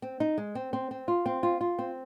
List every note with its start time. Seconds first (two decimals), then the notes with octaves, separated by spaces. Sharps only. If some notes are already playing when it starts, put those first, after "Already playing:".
0.02 C4
0.20 D#4
0.38 G#3
0.55 C4
0.73 C4
0.91 C4
1.08 F4
1.26 C4
1.43 F4
1.61 F4
1.79 C4